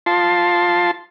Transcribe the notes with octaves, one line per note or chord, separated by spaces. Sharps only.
F4 A5 C6